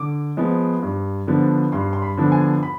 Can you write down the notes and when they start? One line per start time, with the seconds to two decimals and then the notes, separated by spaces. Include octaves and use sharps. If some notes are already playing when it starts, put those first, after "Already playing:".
Already playing: D3 D6
0.37 F3 G#3 B3
0.83 G2
1.27 D3 F3 B3 D4
1.72 G2 C6
1.93 C6
2.02 B5
2.17 D3 F3 B3 D4
2.32 G#5
2.63 B5